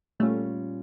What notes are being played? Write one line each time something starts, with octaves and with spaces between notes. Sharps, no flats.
A#2 G3 A3 C#4 F4